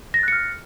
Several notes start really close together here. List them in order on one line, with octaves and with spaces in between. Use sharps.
A#6 A6 F#6 C#7 F6